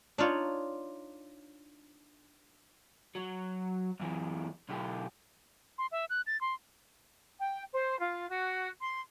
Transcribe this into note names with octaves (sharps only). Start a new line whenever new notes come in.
D4 D#4 F4 C#5
F#3
F#2 E3
B1 G4
C6
E5
F#6
A6
C6
G5
C5
F4
F#4
C6